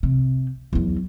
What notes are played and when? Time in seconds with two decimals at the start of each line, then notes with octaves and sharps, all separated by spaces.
0.03 C3
0.73 E2 F#3